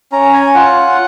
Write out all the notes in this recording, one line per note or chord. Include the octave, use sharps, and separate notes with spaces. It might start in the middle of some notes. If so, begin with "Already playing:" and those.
C#4 A#5
G#5
F4 F#5